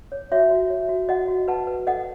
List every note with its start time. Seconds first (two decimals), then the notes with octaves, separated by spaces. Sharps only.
0.12 C#5
0.32 F#4 C#5 E5
0.51 F#4
0.70 C#5
0.89 F#4
1.09 F#4 D#5 F#5
1.28 F#4
1.48 B4 F#5 A5
1.67 B4
1.87 A4 D#5 F#5